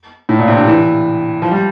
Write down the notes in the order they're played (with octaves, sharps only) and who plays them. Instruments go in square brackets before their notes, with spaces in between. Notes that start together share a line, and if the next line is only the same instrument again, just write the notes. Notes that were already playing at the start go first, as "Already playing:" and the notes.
[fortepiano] A2
A#2
C3
D3
E3
F3
G3